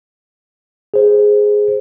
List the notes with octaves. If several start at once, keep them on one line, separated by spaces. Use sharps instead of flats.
G#4 C5